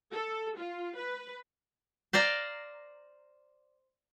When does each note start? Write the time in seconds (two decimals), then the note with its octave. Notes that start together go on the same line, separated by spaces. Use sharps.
0.11 A4
0.57 F4
0.97 B4
2.13 C5 D5 F5 A#5